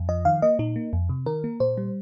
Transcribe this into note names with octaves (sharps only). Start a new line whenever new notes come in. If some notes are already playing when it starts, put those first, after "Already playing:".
Already playing: F2
F3 D#5
D#3 F5
A#3 D#5
A#2 D#4
A#3
F2
C3
D#3 A#4
A#3
A#2 C5
G3